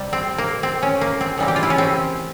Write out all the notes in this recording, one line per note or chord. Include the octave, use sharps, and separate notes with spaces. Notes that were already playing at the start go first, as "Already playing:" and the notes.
Already playing: C3 G3
C4
A#3
C4
C#4
A#3
C4
C#3 E3 G3 A#3
G4
F4
E4
C#4
C4